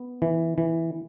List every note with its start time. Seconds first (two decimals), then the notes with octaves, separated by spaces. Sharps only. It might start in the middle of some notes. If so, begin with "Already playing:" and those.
Already playing: B3
0.22 E3
0.58 E3